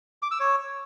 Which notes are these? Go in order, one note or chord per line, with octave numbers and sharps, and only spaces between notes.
D6
E6
C#5